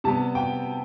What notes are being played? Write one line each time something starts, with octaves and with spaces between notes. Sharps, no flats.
C3 G3 B3 A5
G5